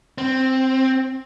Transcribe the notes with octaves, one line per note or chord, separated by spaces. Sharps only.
C4